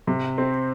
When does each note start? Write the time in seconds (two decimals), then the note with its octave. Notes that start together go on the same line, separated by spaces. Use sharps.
0.07 C3
0.38 C4